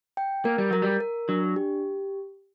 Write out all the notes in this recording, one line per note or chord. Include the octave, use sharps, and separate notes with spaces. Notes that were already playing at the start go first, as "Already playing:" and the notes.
G5
A#3 A#4
G3
F#3 A#4
G3
A#4
F#3 D4
G4